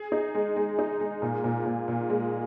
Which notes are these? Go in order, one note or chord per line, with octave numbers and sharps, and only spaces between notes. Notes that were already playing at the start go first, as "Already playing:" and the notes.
Already playing: G#4
D#4
G#3
G#3
D#4
G#3
A#2
A#2
A#2
A#2
G#3